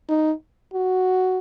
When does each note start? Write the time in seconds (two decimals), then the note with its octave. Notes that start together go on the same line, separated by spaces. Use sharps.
0.09 D#4
0.74 F#4